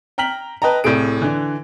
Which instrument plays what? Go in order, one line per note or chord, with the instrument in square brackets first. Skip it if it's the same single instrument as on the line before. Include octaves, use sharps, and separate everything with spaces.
[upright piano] G5 A#5 F6 B6 F#7
B4 D#5 G5 A5 A#5
C2 A2 C3 A3 G#4 D7
D3 E3